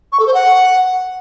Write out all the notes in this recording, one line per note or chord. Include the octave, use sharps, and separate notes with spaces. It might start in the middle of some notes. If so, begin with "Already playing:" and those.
C#6
A4
C5
F#5